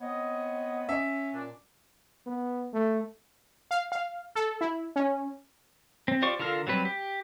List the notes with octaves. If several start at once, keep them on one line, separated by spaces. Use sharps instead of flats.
B3 C4 C#5 D#5
C#4 E5
A#2 D4
B3
A3
F5
F5
A4
E4
C#4
C4
F4 G4 C5 D5 C#6
D3 F4 A4 A#4 F5
F#3 G3 C4 B4
G4